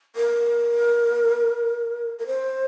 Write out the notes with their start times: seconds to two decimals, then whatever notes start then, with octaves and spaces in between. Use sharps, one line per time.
0.16 A#4
2.19 A#4
2.27 C5